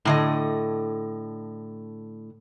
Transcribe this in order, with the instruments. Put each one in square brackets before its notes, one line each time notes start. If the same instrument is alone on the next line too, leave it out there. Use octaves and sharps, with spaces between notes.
[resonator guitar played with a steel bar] A2 D3 D#5